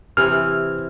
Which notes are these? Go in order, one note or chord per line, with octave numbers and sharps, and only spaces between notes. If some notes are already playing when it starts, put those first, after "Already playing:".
C3 E3 E4 F6